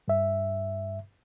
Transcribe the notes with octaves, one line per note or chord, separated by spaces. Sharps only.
G2 E5